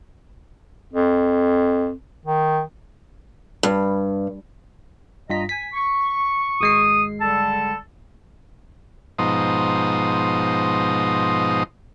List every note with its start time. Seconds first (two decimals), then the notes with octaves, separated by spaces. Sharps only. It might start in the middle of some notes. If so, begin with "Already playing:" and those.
0.93 F2
2.25 D#3
3.63 G2
5.30 G2 F4 D#5 A#5 B6
5.49 G#5 B6
5.73 C#6
6.61 G#1 G#3 D#6 C7
7.20 D3 G3 A4 A5
9.19 G#2 B2 F3 D#4 C5 D#6